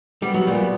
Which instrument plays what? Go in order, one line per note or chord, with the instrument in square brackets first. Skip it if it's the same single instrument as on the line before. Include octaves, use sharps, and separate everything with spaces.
[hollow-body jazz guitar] G3 [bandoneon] B3
[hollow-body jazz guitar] F#3
[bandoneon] A#2 [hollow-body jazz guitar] G3